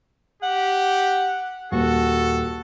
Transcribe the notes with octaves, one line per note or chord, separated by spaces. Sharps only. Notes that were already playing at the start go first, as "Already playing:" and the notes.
G4 F#5
D#1 F#4 A4